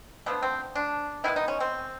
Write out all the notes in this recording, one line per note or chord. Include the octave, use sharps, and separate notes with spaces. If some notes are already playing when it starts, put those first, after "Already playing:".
D3 F3 A3 B3
C4
D4
D#3 G#3 B3 E4
D#4
C#4
C4